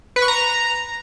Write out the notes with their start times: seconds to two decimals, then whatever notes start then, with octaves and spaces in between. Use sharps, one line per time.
0.16 B4
0.22 C#6
0.28 A#5